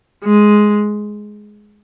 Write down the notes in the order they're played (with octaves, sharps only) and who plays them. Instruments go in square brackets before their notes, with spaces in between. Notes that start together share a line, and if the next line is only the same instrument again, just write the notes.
[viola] G#3